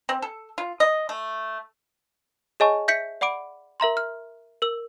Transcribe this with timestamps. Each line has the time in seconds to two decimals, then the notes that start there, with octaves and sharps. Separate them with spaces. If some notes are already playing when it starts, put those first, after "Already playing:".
0.09 C4
0.22 A4
0.58 F4
0.80 D#5
1.09 A3
2.60 G#4 C#5 D#5 G#5 A5 C#6
2.88 E5 G6 B6 C#7
3.21 D5 F#5 B5 D6 D7
3.80 A#4 E5 A#5 C6
3.97 F6
4.62 A#4 E6